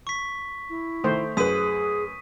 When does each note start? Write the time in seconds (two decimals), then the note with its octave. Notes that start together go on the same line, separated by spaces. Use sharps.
0.07 C#6 B6
0.70 E4
1.04 D#3 A3 C5
1.37 F#2 G#4 B4 D#6 B6 D#7